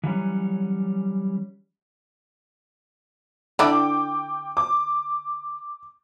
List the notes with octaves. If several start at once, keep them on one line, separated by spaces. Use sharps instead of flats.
E3 F#3 G3 C#4
D3 D4 E4 G5 D6 D7
D6